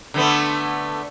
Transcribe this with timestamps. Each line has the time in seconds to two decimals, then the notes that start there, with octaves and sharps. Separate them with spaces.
0.14 D3 A3 B3